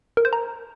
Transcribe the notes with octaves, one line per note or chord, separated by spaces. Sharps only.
A#4
C5
A#5